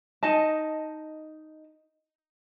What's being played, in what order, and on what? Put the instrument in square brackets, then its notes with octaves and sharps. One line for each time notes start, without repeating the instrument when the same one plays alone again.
[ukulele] D#4 D#5 A5